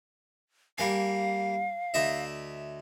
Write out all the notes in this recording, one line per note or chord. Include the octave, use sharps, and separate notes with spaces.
G3 A#3 F5 G#5
D2 D#5 E5